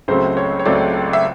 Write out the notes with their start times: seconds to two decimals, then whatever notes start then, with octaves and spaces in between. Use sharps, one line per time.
0.08 C#2 C#3 F#3 A3 C4 C5
0.37 C#5
0.60 C#5
0.66 C#2 C#3 F#3 A3 C4 D5
1.13 E5